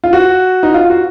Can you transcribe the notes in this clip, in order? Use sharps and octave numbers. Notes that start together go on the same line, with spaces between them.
F4
F#4
D#4
F4
F#4